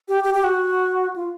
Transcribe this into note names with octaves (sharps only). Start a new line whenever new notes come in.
G4
G4
G4
F#4
F4